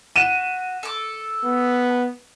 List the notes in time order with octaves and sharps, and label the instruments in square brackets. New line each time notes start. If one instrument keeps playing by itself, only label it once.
[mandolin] F#4 [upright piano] D#7 E7
[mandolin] A4 D6
[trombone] B3